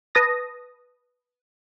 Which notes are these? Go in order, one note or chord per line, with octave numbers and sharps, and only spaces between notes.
B4 A5 D#6 A#6